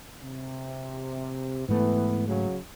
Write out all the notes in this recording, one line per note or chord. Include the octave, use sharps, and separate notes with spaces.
C3
G#2 E3 A3 B3
F#2 C#3 F#3